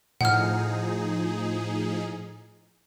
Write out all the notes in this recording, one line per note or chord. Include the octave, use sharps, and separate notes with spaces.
A2 F3 D#4 G#4 F#5 F6